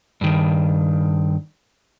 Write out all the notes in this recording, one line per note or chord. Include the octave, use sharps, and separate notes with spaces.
G2 D#3